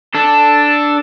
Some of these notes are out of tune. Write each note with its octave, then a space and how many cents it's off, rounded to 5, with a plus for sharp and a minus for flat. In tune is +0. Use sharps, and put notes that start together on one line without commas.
D4 +0 A4 +0